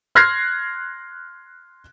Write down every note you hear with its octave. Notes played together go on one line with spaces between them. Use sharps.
C6 F6 F#6 G#6 A#6 C7